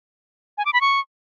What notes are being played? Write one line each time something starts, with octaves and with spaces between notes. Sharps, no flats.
G#5
D6
B5
C#6